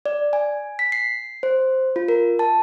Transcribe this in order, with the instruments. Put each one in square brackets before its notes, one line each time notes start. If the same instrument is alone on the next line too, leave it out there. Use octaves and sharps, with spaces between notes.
[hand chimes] D5
G#5
B6
C7
C5
F4
A#4
A5